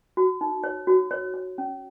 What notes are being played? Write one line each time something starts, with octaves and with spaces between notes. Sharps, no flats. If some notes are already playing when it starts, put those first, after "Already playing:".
F#4
D#4
C#5
F#4
C#5
C#5
C#4